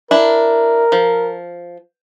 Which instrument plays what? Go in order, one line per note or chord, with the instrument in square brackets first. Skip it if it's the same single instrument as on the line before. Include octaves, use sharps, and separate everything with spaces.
[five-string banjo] D4 E4 [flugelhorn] A#4
[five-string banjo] F3